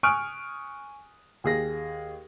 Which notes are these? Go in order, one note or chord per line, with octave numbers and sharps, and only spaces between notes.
G#5 C#6 D#6 F6 F#6 D7
D#2 G#4 A#6